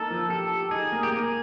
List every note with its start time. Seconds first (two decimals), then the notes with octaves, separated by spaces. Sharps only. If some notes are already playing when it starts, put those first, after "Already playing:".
Already playing: A#3 D#4 A4
0.11 F3
0.30 G4 A4
0.51 G4
0.71 D#4 G#4
0.92 A#3
1.03 G4
1.12 A#3 G#4